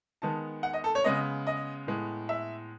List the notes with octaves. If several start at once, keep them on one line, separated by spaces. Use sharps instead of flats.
D#3 G#3 B3 A5
F#5
D#5
A4
C#5
C#3 G#3 B3 D#5
D#5
A2 G#3 B3
E5